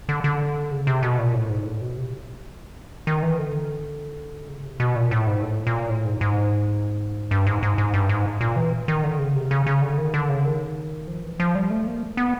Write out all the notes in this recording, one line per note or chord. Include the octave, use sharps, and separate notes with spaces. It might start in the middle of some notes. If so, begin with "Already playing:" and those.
D3
D3
C#3
C3
B2
A#2
A2
G#2
A2
B2
C3
D#3
E3
D3
C#3
C3
B2
A#2
A2
G#2
A2
A#2
A2
G#2
G#2
G2
G#2
G#2
G#2
G2
G#2
A#2
E3
D#3
D3
C#3
C3
C#3
C#3
D3
D#3
D3
C#3
D#3
F3
E3
F3
G3
A3
A#3
B3